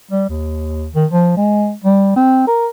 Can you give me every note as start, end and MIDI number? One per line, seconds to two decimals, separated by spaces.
0.11 0.26 55
0.29 0.89 39
0.94 1.06 51
1.11 1.36 53
1.37 1.73 56
1.84 2.15 55
2.16 2.44 60
2.47 2.68 70